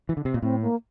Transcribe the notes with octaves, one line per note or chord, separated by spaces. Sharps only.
E3
D3
C3
A#2
A2 C4
A#3